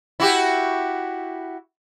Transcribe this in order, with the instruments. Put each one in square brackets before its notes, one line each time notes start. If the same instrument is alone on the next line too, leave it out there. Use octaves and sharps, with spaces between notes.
[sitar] E4 F#4 G4